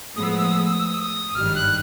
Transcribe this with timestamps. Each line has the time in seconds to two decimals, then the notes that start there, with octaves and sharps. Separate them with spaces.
0.16 A2 F3 G#3 B3 D#6
0.23 E6
0.30 D#6
0.38 E6
0.44 D#6
0.52 E6
0.59 D#6
0.65 E6
0.73 D#6
0.79 E6
0.86 D#6
0.94 E6
1.00 D#6
1.35 G#1 G2 D#3 G3 F6
1.55 F#6